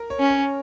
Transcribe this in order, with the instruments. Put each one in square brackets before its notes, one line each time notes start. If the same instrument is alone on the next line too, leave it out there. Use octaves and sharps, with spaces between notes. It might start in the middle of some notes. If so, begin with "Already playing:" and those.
Already playing: [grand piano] A#4
C#5
[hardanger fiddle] C#4
[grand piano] C#5